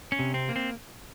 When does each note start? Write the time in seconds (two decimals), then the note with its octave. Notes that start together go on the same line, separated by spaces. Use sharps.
0.12 C#4
0.19 C3
0.34 C4
0.49 A#3
0.56 C4